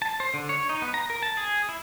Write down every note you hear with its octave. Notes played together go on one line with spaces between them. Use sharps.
A5
C5
D3
C#5
D#4
B3
A#5
A#4
A5
G#4
E4